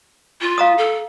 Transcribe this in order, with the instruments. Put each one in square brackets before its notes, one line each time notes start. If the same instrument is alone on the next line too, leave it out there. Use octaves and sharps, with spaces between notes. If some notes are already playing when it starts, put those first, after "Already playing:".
[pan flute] F4
[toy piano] F5 A#5 D#6
[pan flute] A4